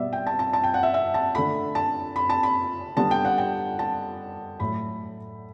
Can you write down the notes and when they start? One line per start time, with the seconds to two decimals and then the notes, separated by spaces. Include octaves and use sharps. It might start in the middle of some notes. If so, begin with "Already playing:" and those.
Already playing: B2 G3 B3 D5 E5
0.13 G5
0.27 A5
0.39 A5
0.53 A5
0.64 G5
0.74 F#5
0.83 E5
0.94 E5
1.14 A5
1.35 D3 A3 B5
1.75 A5
2.16 B5
2.29 A5
2.43 B5
2.97 D3 G3 B3 A5
3.11 G5
3.25 F#5
3.38 G5
3.79 A5
4.60 A2 F#3 A3 B5